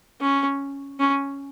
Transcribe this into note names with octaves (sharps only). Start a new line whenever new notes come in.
C#4
C#4